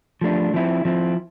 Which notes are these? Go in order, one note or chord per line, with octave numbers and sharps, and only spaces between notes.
F3 A3 D4
F3 C4 E4
F3 C4 E4